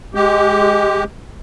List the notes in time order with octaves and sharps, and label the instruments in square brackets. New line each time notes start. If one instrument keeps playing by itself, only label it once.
[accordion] G#3 G4